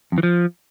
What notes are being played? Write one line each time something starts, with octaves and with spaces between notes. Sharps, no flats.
F2
E3
F3